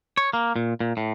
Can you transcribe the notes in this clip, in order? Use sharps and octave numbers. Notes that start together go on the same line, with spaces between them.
C#5
A#3
A#2
A#2
A2